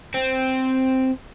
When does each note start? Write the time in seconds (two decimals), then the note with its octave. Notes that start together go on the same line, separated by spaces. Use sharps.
0.14 C4